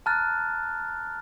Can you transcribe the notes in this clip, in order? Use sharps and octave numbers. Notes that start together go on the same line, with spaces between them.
A5 A#5 F6 F#6 A6